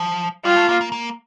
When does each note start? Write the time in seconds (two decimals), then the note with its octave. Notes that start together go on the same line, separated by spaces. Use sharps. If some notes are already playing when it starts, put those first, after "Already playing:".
Already playing: F3
0.45 G3 F4
0.57 A3
0.69 A#3
0.81 A#3
0.92 A#3